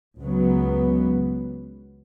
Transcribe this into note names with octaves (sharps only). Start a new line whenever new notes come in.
C#2 C#3 F#3 B3